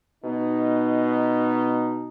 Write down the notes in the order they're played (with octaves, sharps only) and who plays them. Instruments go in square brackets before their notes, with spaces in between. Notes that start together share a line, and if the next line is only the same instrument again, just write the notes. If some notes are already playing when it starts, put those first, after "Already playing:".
[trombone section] B2 D#4